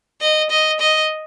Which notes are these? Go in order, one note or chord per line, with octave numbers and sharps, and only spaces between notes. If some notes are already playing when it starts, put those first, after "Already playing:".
D#5
D#5
D#5